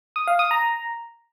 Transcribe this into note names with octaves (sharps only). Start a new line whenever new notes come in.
D#6
F5
D#6
A#5